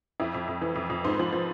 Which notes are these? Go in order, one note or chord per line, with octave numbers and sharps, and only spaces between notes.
F2 E4
F2
F2
E3
F2
F2
G#2 C5
B4
F3 C5
F3